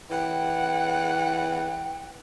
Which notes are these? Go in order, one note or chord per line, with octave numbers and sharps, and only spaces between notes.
E3 F#5 G5